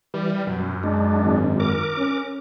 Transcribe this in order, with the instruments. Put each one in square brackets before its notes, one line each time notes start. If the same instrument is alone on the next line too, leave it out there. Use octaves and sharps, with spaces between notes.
[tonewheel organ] E3 [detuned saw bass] G3
[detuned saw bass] F#2 [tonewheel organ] B2
[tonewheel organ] G#3 D4
[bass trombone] G#1
[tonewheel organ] A#4 D6
[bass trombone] C#4